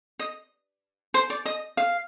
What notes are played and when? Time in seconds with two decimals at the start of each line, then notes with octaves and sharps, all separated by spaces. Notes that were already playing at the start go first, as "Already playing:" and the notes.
0.19 D#5
1.14 C5
1.30 D5
1.46 D#5
1.77 F5